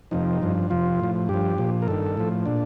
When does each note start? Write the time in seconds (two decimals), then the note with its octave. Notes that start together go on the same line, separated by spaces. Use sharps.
0.11 F2 C3 F3 D#4
0.42 G2 F3
0.70 F2 C3 F3 F4
1.00 A2 F3
1.29 G2 F3 G4
1.58 A#2 F3
1.82 A#4
1.88 G2 D#3 A4
2.17 A2 F3
2.46 A#2 D4